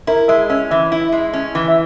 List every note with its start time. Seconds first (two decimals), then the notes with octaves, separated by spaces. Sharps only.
0.07 E4 A#4
0.28 G#3 E5
0.50 C#4 E5
0.71 E3 E5
0.92 E4
1.12 G#3
1.33 C#4
1.55 E3
1.68 E5